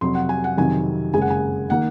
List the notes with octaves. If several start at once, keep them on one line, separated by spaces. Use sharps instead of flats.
F2 C3 F#3 C6
F#5
G#5
F#5
F2 C3 D#3 F#3 G#5
F#1 F#2 C#3 G#3 G#5
F#5
G#5
D#3 A#3 F#5